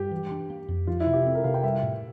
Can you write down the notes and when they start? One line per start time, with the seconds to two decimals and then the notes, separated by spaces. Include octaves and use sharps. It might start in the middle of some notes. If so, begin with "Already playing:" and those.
Already playing: G2 G4
0.11 E3
0.31 D4
0.50 A#3
0.69 F2
0.87 F3 F4
1.00 E4
1.06 C3
1.13 G4
1.25 C4 A4
1.35 A#4
1.44 C3 F5
1.54 G5
1.64 G3 E5
1.83 A2